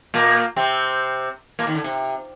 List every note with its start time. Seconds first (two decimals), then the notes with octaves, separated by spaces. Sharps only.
0.14 A#2 A#3
0.56 C3 C4
1.59 A#2 A#3
1.67 D#2 D#3
1.75 D3
1.84 C3